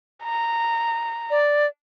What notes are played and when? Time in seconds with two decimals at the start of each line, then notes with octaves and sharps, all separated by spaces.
0.25 A#5
1.30 D5